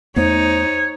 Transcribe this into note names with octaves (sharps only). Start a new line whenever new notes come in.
E2 A3 B3 D#4 C5 C#5